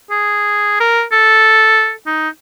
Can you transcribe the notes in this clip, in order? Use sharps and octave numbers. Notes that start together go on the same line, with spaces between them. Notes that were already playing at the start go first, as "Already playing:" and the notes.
G#4
A#4
A4
D#4